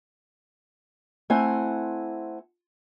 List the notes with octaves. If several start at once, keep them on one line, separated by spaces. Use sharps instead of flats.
A3 C4 E4 F#5 G#5